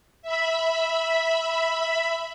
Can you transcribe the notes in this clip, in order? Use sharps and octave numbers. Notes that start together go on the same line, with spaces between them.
E5 B5